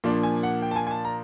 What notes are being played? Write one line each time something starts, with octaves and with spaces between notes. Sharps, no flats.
A#2 F3 A#3 D4
G#5
F#5
G5
A5
G#5
G#5
A5
A#5